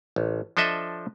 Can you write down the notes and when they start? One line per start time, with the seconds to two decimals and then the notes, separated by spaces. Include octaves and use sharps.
0.16 A1
0.57 F3 D4 A4 D#5 E5